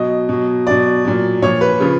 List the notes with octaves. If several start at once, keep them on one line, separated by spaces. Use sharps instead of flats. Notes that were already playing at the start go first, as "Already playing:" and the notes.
Already playing: B2 F#3 D#5
B2 F#3
B2 F#3 D5
A#2 F#3
A#2 F3 C#5
B4
C#3 F3